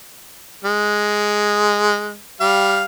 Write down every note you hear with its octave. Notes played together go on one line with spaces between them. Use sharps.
G#3
G3 F5